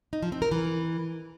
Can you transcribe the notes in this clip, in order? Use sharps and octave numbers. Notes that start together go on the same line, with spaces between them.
D#4
F3
C4
A#4
E3